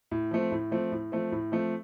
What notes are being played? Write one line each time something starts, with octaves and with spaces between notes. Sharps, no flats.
A2
F3 A3 C4
A2
F3 A3 C4
A2
F3 A3 C4
A2
F3 A3 C4